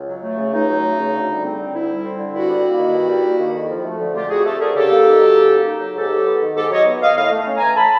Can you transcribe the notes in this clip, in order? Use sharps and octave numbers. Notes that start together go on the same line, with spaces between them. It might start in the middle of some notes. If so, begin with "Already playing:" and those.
Already playing: C#2
F#3
A3
C#3
C#2 D#4
F#3
A3
C#3
D2
G3
C4
D3
D2 E4
G3
C4
D3
G2 E4 F#4
G3
A#3
D#3
G2
G3
A#3
D#3
F2
F3
A3
D3
F2 F4 G4
F3 F#4 G#4
A3 G4 A4
D3 G#4 A#4
C#3 G4 A4
A#3
D#4
F#3
C#3
A#3
D#4
F#3
G#2 G4 A4
F#3
B3
D#3
G#2 G4 A4
F#3 C#5 D#5
B3
D#3 D#5 F5
A2 D#5 F5
A3
C#4
G#5 A#5
E3
A2 A5 B5